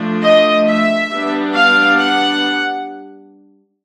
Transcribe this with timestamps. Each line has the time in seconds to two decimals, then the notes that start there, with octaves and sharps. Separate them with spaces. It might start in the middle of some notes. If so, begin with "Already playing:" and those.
Already playing: F3 A3 D4
0.24 D#5
0.67 E5
1.11 G3 B3 D4
1.55 F5
1.99 F#5